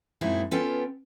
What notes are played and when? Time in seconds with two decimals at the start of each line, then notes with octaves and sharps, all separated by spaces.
0.21 F#2 A#2 G#3 C4 D#4 E4
0.51 B3 C#4 F4 A4 G5